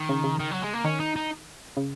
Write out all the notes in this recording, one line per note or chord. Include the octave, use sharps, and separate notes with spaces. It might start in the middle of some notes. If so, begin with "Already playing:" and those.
Already playing: D#3
C#3
C#3
D#3
F#3
G#3
A#3
D#3 C#4
D#4
D#4
C#3